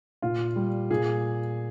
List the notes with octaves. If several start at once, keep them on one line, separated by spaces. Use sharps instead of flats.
A#2 F4
G3
A#2 G#4